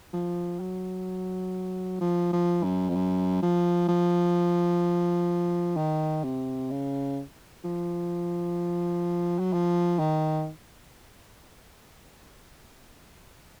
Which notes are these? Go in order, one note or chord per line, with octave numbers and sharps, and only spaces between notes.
F3
F#3
F3
F3
F#2
F2
F#2
F3
F3
D#3
C3
C#3
F3
F#3
F3
D#3